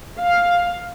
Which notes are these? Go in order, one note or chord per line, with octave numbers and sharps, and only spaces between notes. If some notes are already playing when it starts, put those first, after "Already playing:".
F5